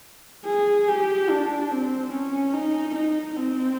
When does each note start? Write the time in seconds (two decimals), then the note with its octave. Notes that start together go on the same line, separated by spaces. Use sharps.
0.46 G#4
0.88 G4
1.30 D4
1.71 C4
2.12 C#4
2.54 D#4
2.95 D#4
3.37 C4